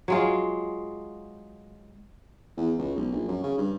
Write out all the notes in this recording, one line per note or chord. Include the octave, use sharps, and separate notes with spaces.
F#3 G#3 F4
E2
C#2
B1
A#1
F#2
C#3
G2